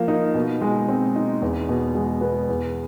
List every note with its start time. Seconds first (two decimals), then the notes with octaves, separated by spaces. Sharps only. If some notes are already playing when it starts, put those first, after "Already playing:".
Already playing: F3 A#3
0.08 D#4
0.35 B2
0.61 G#3
0.89 C4
1.16 D#4
1.42 E2
1.69 B2
1.95 G#3
2.21 B3
2.48 E2